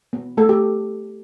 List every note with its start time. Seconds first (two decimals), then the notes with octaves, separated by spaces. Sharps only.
0.13 B3
0.37 A3 A4
0.49 G4